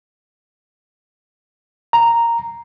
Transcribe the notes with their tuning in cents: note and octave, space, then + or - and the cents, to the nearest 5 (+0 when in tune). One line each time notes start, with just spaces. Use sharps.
A#5 -5